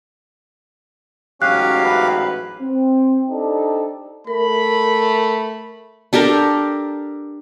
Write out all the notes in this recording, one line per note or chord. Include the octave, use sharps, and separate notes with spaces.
A1 G#2 F#3 C#4 G4 F5 F#6
B4
C4
D4 D#4 G4 A4 C5 D5
A3 A#4 B5
D4 G4 A4 A#4